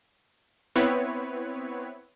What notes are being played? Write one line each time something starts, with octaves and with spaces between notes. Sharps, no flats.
B3 C4 E4 B4 C#5